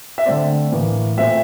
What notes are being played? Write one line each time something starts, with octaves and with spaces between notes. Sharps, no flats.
E5
D3 A3 C4 D5
A2 E3 A#3
A#2 A3 C4 E5